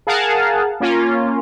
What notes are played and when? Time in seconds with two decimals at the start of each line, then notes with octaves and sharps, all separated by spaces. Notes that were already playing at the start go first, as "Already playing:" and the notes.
0.07 G#4 A#4 F5 F#5 A5
0.80 A#3 C#4 F4